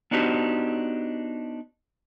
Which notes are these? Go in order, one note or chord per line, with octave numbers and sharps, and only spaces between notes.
B3 D4 D#4 F#4 G4 C5